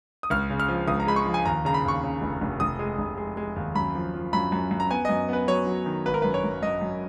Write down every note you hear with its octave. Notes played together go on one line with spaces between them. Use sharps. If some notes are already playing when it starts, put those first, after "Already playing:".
D#6
C#2 F6
C#3
F6
F3
C#2 D#6
A#5
G#3 B5
C#6
F3
G#5
D#2 A#5
C#3 A#5
B5
D#2 C#6
C#3
F1
F1
F1 D#6
G#3
F1
G#3
G#3
D#2
F#2 B5
F3
F3
F#2 B5
F#2
F#2
A#5
B3 G#5
F#2 D#5
B3 B4
F#3 C#5
F#3
D#3
G#1 B4
A#4
F#2 B4
C#5
F#2
F#2 D#5
F#2